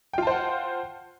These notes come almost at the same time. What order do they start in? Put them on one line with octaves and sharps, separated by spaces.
G5 F4 A5 C5 F#5